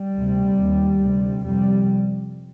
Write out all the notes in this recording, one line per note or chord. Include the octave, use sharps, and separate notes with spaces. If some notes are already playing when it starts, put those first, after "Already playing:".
Already playing: G3
D2 C3
D#2
D2 C3
F2 C3 G3